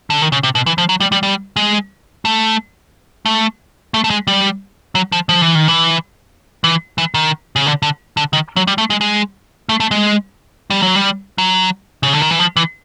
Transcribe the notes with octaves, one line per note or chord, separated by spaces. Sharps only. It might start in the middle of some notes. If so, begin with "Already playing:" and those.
D3
D#3
C#3
C3
B2
E3
F3
F#3
G3
G3
G3
G#3
A3
A3
A3
A3
G#3
G3
F#3
F3
F3
E3
D#3
E3
E3
E3
D#3
C#3
D3
D3
D3
D#3
F#3
G3
A3
G#3
G#3
A3
A3
G#3
G3
F#3
G3
F#3
C#3
D3
D#3
E3
F3
E3